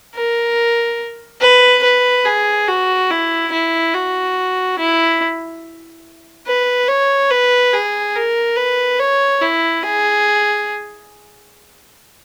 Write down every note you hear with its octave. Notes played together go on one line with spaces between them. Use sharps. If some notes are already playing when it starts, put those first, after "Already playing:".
A#4
B4
B4
G#4
F#4
E4
E4
F#4
E4
B4
C#5
B4
G#4
A#4
B4
C#5
E4
G#4